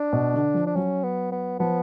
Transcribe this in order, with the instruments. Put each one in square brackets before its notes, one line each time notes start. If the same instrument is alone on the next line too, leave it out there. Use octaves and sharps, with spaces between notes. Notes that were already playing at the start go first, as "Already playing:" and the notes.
Already playing: [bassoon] D4
[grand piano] B2
D3
F3
[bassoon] D4
[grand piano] F#3 [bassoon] C#4
[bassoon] B3
B3
[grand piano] F3 [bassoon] B3